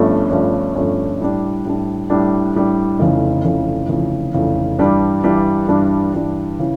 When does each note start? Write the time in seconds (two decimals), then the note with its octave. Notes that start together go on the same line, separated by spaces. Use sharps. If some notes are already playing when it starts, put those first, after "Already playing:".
Already playing: G1 G2 F3 A3 C#4
0.30 G1 G2 F3 A3 C#4
0.75 G1 G2 F3 A3 C#4
1.20 A2 G3 D4
1.65 A2 G3 D4
2.10 A2 G3 D4
2.54 A2 G3 D4
2.99 F1 F2 C#3 E3
3.44 F1 F2 C#3 E3
3.89 F1 F2 C#3 E3
4.34 F1 F2 C#3 E3
4.78 G2 E3 G3 D4
5.24 G2 E3 G3 D4
5.68 G2 E3 G3 D4
6.14 G2 E3 G3 D4
6.59 C#3 E3